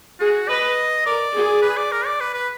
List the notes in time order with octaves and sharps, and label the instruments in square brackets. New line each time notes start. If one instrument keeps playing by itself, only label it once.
[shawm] F#4 [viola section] G#4
[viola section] B4 [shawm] D#5
[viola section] A#4 [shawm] D5
[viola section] G#4
[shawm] B4
D5
A#4
D5
B4
B4